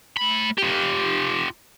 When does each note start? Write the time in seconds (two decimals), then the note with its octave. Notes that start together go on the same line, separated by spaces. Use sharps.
0.17 A3 B5
0.58 F4 G4